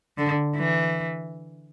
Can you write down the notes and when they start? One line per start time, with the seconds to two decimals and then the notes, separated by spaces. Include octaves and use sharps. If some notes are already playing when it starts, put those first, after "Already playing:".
0.18 D3
0.57 E3